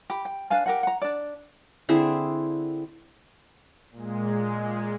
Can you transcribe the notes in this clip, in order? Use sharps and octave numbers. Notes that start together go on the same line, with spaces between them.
G4 B5
G5
D4 B4 F5 G#5
G4 A#4 F#5
F#5 A#5
D4 D5
D3 C4 E4 G#4
A#2 G#3